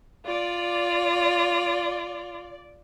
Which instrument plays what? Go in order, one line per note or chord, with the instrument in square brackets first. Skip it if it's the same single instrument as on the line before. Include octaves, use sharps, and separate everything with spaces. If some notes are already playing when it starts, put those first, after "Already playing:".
[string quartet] F4 [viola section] D5